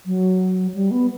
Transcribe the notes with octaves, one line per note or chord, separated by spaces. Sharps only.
F#3
G3
B3